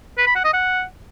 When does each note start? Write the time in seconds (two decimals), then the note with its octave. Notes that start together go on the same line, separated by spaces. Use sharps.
0.18 B4
0.27 B5
0.36 F#5
0.44 D#5
0.53 F#5